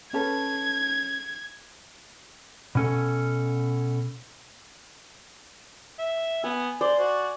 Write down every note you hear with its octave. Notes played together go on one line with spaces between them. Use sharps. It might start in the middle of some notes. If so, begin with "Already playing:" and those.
C#4 A4 B4 G#6
B2 C#4 A4
E5
B3 G#5
C5 D5
F#4